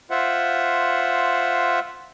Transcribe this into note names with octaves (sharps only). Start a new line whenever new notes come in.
F4 C5 E5 F#5